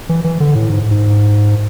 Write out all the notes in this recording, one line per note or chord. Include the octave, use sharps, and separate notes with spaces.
E3
E3
D3
A2
G#2
G#2